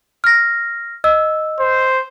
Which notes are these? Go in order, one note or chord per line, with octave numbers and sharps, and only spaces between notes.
F6 A#6
D#5 E6
C5